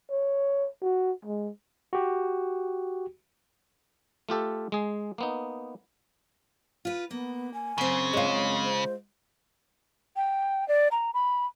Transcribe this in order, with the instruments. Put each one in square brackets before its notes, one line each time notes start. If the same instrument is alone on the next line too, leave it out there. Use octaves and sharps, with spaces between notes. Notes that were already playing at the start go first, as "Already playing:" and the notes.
[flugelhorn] C#5
F#4
G#3
[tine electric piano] F#4 G4
[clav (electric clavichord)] A3 F4 G4 A4
G#3 G#4
A#3 B3 D#4
[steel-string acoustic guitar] F4 B4
[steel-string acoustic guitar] A#3 [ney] B3
[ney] G#5
[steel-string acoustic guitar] F#2 C4 [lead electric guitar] C#3
[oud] G#3 F4 [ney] C#5
[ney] C5
[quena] G5
D5
A#5
B5